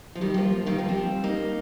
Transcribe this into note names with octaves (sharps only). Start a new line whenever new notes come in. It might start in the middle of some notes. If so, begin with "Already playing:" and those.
F3
D#3 G3
G3
F3 A#3
D#3 G3
F3 A#3
G3 C4
A#3 D#4